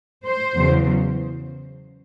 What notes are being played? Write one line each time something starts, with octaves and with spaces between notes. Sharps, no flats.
C5
E2 C#3 F#3